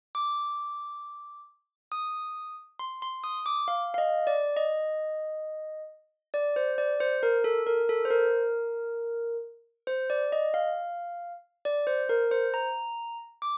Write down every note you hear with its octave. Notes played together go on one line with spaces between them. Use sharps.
D6
D#6
C6
C6
D#6
D6
F5
F5
D#5
D5
D#5
D5
C5
D5
C5
A#4
A4
A#4
A4
C5
A#4
C5
D5
D#5
F5
D5
C5
A#4
C5
A#5
D6